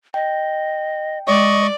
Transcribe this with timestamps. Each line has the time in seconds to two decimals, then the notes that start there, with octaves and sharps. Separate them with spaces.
0.14 D#5 G5
1.27 G#3 D5 D#5 C#6